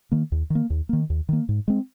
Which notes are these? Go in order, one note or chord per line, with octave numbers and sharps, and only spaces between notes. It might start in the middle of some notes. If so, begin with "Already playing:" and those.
D#3 A#3
D#2
D#3
A#3
D#2
D#3 A#3
D#2
D#3 A#3
G#2
G#3 C4